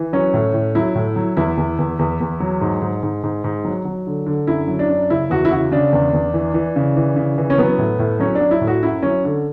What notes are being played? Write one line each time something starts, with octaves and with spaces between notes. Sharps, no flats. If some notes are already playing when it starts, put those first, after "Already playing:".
Already playing: E3
F#3 C#4
A2
A2
F#3 E4
A2
F#3
E2 E4
E2
E2
E2
E2
F#3
G#2
G#2
G#2
G#2
G#2
F#3
F#3
D3
D3
F#2 E4
F#3
D4
F#2
C#3 E4
E2 F#4
E4
C#3 F#4
C#3 D4
E2
E2
E3
E3
C#3
E3
C#3
E3
C#4
F#3 B3
A2
A2
F#3 C#4
D4
F#3
E4
A2
F#4
F#2 E4
F#3 C#4
D3